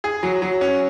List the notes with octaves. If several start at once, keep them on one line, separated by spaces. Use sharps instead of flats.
G#4
F#3
F#3
C#4